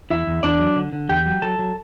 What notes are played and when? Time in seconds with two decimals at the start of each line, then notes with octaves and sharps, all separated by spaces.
0.10 E2 E4 E5
0.27 E2
0.43 E2 D4 D5
0.60 F#3
0.76 D3
0.93 D3
1.09 E2 G4 G5
1.26 F#3
1.42 F#3 A4 A5
1.59 F#3